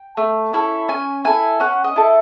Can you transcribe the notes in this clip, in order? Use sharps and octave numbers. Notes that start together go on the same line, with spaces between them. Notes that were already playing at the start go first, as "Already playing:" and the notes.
Already playing: G5
A3
C#4 E4 A4
C#4 G#5
E4 A4 G#5
C#4 F#5
D#5
E4 A4